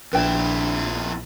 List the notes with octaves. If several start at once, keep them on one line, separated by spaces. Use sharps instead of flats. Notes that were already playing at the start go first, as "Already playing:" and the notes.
A#1 F2 D4 E4 B4 D5 G5